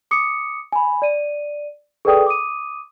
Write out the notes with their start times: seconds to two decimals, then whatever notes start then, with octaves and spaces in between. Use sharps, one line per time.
0.11 D6 D#6 C#7
0.72 G#5 B5
1.02 D5 D#7
2.05 G#4 A4 B4 D5 G5 D#6
2.26 D6 D#6 D#7